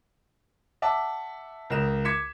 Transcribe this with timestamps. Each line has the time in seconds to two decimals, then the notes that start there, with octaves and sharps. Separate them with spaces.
0.82 E5 F#5 A5 D6
1.70 C#2 A#4 D#5 E7
2.05 D6 G#6 B6 C#7 E7